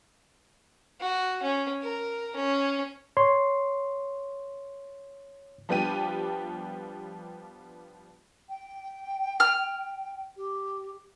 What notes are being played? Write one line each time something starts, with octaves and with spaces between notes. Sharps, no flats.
F#4
C#4
A#4
C#4
C#5 C6
F3 G3 B3 D4 G4 D#7
G5
F6
G4